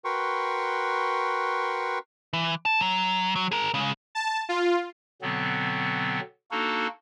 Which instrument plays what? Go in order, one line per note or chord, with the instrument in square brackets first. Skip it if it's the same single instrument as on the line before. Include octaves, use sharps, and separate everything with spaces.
[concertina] F#4 A#4 B4 G5 C6 C#6
[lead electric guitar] E3
A5
F#3
F#3
G#4 A#4
C#3 G#3
[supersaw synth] A5
F4
[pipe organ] B2 D3 F#3 B3 C4
A#3 D4 D#4 F#4 A4